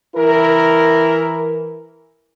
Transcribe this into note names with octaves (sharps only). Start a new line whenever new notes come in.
E3 E4 A#4